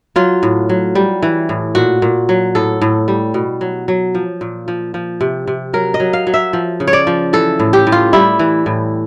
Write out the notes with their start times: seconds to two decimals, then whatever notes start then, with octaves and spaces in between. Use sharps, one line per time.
0.16 F#3 F4
0.43 A2
0.69 F#3
0.95 G3
1.22 E3
1.49 A2
1.75 A#2 F#4
2.02 A#2
2.29 F#3
2.55 A2 A4
2.82 A2
3.08 G3
3.34 B2
3.61 F#3
3.88 F#3
4.15 F3
4.41 A#2
4.68 F3
4.94 F3
5.21 C3
5.47 C3
5.73 F#3 A#4
5.94 D#5
6.00 F#3
6.13 F5
6.27 F#3
6.34 E5
6.53 F3
6.80 C#3
6.87 C#5
6.93 D5
7.07 F3
7.33 E3 A4
7.59 A2
7.73 G4
7.87 A2
7.92 F4
8.13 G3 E4
8.39 E3
8.66 A2